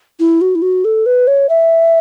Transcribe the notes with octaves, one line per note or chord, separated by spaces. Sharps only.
E4
F#4
E4
F#4
A4
B4
C#5
E5